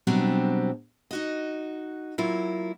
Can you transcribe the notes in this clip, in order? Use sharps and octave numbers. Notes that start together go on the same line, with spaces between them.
B2 F#3 G3 C4 D4 G4
D#4 F#4 D#5
F#3 A#3 E4 F4